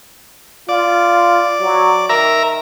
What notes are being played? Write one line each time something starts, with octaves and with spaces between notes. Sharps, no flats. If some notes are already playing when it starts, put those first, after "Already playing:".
F4 D5
F#3
D#3 A#4 E5 A#5